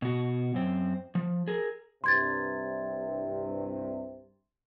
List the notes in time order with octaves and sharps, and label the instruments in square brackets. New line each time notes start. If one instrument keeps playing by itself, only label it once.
[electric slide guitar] B2 F#4
F#2 C4
F3
G#4 A#4
[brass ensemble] C2 G2 C3 [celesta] C6 G#6 A6